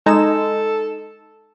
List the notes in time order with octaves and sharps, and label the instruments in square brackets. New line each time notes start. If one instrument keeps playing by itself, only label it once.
[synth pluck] G#3 E7 [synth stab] D#4 [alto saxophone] A4